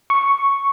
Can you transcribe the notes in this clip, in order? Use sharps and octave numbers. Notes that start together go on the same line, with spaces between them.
C#6